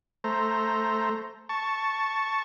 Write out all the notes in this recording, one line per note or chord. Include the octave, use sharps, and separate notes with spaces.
A3 C5 A#5
A5 C#6